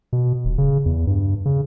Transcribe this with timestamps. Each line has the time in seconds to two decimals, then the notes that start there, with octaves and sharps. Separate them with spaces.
0.13 B2
0.45 D#1
0.58 C#3
0.86 E2
1.07 G2
1.46 C#3